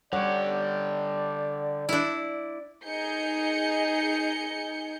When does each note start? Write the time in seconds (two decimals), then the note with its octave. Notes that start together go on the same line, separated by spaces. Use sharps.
0.13 D3 G3 G4 C#5 D5 F#5
1.89 D4 E4
2.84 D#4 G#4 G6 C#7